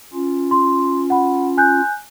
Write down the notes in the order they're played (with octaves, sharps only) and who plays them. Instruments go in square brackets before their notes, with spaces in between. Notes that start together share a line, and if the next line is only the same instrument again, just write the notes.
[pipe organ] C#4 F4
[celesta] C6
F#5 B5
G#5 F#6 G6